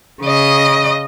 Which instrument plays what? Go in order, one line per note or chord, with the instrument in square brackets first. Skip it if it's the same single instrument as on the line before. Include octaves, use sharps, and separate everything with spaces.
[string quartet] C#3 D#5